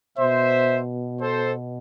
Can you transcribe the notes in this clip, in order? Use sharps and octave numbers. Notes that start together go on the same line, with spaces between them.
B2 C5 E5
A4 C5